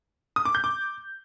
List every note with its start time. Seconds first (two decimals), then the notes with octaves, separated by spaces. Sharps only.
0.36 D#6
0.45 D6
0.55 G6
0.64 D6